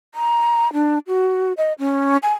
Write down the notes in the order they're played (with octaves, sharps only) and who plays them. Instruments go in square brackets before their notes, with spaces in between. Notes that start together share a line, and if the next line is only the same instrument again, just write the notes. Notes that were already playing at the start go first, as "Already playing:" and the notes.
[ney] A#5
D4
F#4
D#5
C#4
G#5